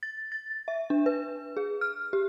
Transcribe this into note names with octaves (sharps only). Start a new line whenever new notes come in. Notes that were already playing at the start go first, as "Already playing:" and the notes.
A6
A6
E5
D4
B4
G#4
F6
G4